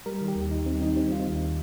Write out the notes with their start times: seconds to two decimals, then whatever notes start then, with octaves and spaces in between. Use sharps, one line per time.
0.06 G3 A#4
0.21 D#3
0.28 G4
0.35 D#2
0.51 D#2 D#4
0.66 G3 C4
0.81 D#3 D#4
0.96 G3 C4
1.12 D#3 F4
1.19 D#4
1.26 D#2